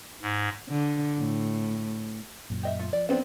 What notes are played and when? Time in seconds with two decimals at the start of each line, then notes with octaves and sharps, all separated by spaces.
0.22 G#2
0.69 D3
1.18 A2
2.50 F#2 A#2
2.63 G4 D#5 E5
2.79 A3 F4
2.93 F3 D5
3.09 B3 C4 D4 F4 F#5